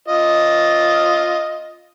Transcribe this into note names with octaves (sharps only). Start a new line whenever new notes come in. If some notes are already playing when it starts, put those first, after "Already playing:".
F4 D#5